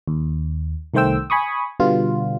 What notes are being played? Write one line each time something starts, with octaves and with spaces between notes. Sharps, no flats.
D#2
C2 D#3 A3 C5 G5 E6
G#5 B5 C#6 D#6
B2 D3 G3 B3 F4